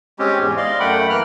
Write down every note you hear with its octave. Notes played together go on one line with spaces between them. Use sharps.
G#3 C4 C#4 G4
E2 G#2
D5 D#5 F5 C6
F#2 A3 F#5 G5 B5
E3 A#3 A#4 F6 F#6